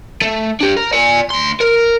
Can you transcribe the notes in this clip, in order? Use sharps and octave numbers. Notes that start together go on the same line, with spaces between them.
A3
D4 G4
A#4
D5 G#5
D2 C6
A#4